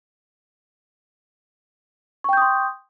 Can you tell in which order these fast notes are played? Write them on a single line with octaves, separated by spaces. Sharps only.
C#6 G5 G6 D#6 C6